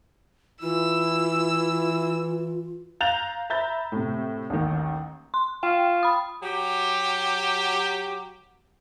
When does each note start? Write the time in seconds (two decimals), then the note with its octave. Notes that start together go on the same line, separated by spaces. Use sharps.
0.62 E3 E4 F4 E6
3.00 F5 A#5 F#6 G6 A6 F7
3.50 E5 A#5 B5 G6 A6
3.92 A2 C3
4.50 A1 D#2 D#3
5.34 C6
5.63 F4 G5
6.03 B5 D#6
6.43 F#3 G4